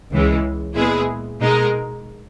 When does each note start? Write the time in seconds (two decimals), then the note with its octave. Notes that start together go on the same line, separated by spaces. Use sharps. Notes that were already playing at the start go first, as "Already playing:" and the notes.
0.11 C#2 C#3 E3 G#3
0.75 A#2 G#3 B3 E4 G#4
1.40 B2 G#3 D#4 A#4